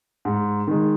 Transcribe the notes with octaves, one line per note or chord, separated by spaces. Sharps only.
G#2
D#3 G#3